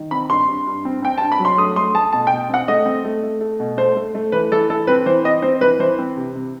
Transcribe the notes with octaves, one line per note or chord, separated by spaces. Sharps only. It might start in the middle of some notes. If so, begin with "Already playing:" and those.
Already playing: D#3
C4 B5
G2 C6
G2
G2
C4
C4 G5
G2 A5
B5
F#3
C6
A3 D#6
A3 C6
A3 A5
B2 A5
G5
B2
C4 F#5
A3 D#5
C4
A3
A3
A3
B2
A3 C5
A3
A3
E3 B4
E3 A4
E3 A4
C4 B4
E3 C5
C4 D#5
C4 C5
E3 B4
E3 C5
C4
C3
C3